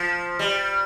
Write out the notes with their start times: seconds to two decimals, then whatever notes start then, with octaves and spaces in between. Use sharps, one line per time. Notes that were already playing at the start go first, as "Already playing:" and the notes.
Already playing: F3
0.39 G3